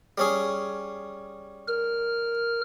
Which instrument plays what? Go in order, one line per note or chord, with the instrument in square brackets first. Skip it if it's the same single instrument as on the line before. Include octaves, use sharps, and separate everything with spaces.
[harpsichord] G3 C#4 G#4
[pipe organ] A#4 F6